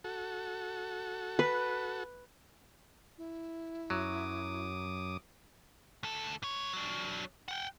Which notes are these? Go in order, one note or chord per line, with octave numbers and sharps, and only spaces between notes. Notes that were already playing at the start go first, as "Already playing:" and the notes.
F#4 A4
B4
E4
F#2 F#3 D6 D#6
D2 A4
G#2 C#5
F#3 D4
F#5 G5